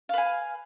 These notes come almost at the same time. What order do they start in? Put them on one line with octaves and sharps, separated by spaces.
F5 B4 G#5